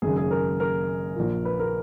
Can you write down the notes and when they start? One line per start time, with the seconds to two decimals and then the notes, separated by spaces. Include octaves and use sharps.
0.02 G#1 F#2 C#3 G#4
0.16 G#4
0.31 A#4
0.60 A#4
1.16 A#1 A#2
1.45 B4
1.59 A#4